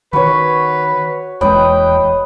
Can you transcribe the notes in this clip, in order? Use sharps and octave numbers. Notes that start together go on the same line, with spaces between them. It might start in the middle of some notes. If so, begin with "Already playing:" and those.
D#3 F#4 B4 C#5
D#1 E2 G#3 B4 C#5 D#5 G5